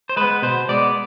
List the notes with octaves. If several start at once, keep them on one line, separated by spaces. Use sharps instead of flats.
C5
G#3 B3 B4
B2 C5
G#3 B3 D5